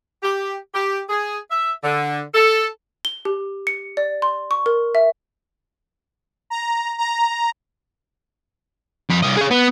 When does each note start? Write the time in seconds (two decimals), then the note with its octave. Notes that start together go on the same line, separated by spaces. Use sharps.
0.23 G4
0.74 G4
1.09 G#4
1.51 E5
1.84 D3
2.34 A4
3.05 G7
3.25 G4
3.67 C#7
3.97 D5
4.22 C6
4.51 C#6
4.66 A#4
4.95 E5
6.50 A#5
6.98 A#5
9.09 F2 B5
9.22 C2 D#5
9.37 G#4 C#5
9.50 B3